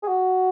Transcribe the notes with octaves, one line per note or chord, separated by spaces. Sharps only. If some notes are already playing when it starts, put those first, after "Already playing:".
G#4
F#4